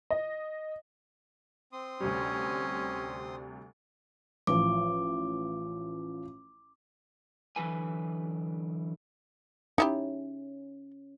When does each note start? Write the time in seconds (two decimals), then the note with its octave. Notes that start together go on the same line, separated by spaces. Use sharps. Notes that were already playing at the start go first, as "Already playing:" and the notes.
0.11 D#5
1.72 C4 C6 D#6
2.00 D2 C3 G3 C#4
4.47 A1 F3 D6
7.56 D3 E3 F#3 B4 G#5
9.78 C#4 D#4 E4 G4